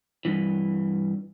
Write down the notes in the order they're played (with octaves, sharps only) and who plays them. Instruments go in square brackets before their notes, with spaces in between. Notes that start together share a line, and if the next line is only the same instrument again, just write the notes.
[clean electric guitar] G2 E3